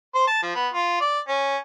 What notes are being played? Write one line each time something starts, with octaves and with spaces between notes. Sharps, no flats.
C5
A5
F3
B3
F4
D5
C#4